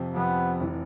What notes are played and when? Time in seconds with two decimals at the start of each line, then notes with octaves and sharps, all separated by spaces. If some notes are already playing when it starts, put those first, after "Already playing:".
Already playing: F2 C3 F3
0.14 F2 C3 F3 B3
0.60 F1 E3